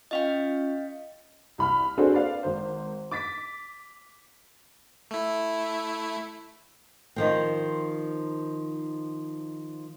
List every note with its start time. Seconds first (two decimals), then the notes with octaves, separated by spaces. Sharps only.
0.11 C#4 F4 D#5 F5 G5
1.58 C2 B5 F6
1.98 C4 D4 F#4 G#4 A4 C5
2.14 B4 D5 F5
2.43 G#1 C5
3.11 D6 A6 B6
5.11 A3 E4
7.16 D#3 F3 C4